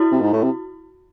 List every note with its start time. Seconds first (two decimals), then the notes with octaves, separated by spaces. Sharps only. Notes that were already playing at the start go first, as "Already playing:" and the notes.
Already playing: E4 F#4
0.12 C3
0.22 G#2
0.33 A2
0.43 C3